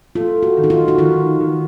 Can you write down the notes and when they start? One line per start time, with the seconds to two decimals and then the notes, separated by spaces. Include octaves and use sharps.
0.15 A3 F4
0.43 F#4
0.57 D#3
0.64 D#4
0.70 F4
0.88 F#4
0.98 D#3 F4
1.40 D#3